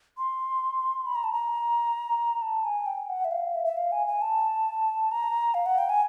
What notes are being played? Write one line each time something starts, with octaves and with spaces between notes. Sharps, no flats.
C6
B5
A#5
A5
A#5
A5
G#5
G5
F#5
E5
F5
E5
E5
F5
G#5
G#5
A5
A#5
F5
F#5
G5
G#5